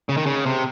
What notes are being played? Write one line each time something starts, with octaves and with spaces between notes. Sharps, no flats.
C#3
D#3
C#3
C3